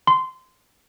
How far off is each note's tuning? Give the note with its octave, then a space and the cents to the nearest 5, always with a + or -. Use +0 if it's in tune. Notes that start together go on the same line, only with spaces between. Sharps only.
C6 -15